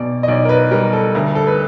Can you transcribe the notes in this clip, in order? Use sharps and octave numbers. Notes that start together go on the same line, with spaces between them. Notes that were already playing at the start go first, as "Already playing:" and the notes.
Already playing: B1 B2 D5
D#5
B1 D5
A#4
B4
G3 A#4
A4
D2 A#4
A4
B4